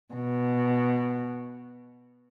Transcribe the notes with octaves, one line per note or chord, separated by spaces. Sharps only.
B2